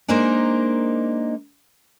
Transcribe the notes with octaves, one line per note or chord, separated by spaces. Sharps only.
G#3 A#3 D4 D#4 A#4 C5